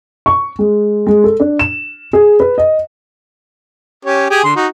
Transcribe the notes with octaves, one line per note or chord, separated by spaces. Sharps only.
C#6
G#3
G#3
A4
D4
E7
G#4
B4
D#5
C#4 G4 C#5
G4 G#4 G#5
D3 C6
D#4 F#4